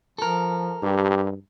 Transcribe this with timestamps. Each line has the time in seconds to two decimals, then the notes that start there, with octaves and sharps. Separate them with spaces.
0.18 F3 A4 A#4
0.83 G2 G4